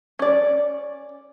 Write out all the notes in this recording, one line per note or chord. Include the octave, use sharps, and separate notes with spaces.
C#4 D5